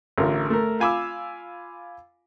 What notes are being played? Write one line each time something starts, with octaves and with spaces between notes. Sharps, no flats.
A1 D3 F4 A#4
A3 A#4
F4 F5 G#5 B5 D6 E6